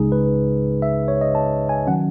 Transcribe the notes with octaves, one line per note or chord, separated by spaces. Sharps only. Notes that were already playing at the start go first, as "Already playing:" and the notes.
Already playing: C#2 C#3 G#3 D#4 G#4
B4
E5
C#5
D#5
A5
G#5
D#3 F#3 C#4 F#5